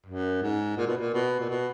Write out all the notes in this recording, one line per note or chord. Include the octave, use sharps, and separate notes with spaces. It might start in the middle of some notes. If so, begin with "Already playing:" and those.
F#2
G#2
A#2
B2
A#2
B2
A#2
B2